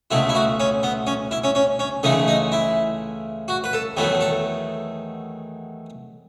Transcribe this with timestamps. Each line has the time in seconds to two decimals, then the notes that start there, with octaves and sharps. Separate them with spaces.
0.11 C#2 B2 A3 E4
0.29 E4
0.35 F#4
0.60 C#4
0.83 B3
1.07 C#4
1.31 E4
1.44 C#4
1.55 C#4
1.79 C#4
2.03 C#2 C#3 E3 A3 D#4
2.28 D#4
2.52 E4
3.48 F#4
3.64 B4
3.73 A4
3.97 E2 D#3 F#3 A3 B3
4.21 A4